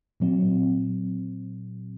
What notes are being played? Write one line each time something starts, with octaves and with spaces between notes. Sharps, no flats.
A#2 F#3 C4